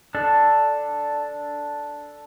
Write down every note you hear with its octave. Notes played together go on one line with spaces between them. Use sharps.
D4 A4